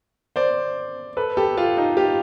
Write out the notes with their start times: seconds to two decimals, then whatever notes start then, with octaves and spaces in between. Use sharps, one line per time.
0.36 C5 D5
1.17 A4 B4
1.37 G4 A4
1.57 F4 G4
1.77 D#4 F4
1.97 F4 G4